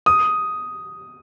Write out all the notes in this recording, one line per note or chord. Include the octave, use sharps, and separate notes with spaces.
D#6